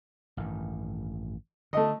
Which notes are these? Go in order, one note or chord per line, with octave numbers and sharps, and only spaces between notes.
A1 G2 D#3
D3 A3 D#5